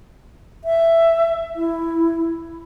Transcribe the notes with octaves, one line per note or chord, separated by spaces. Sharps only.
E5
E4